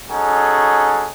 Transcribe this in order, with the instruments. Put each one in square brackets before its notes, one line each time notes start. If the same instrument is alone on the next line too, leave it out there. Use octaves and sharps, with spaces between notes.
[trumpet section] C#4 D#4 F#4 G#4 A4